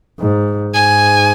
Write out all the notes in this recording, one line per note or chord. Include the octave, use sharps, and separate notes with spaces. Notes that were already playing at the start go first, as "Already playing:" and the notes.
G#2
G#2 G#5